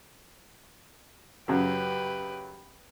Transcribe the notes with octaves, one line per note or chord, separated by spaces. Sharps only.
F#2 C#3 F#3 G4 B4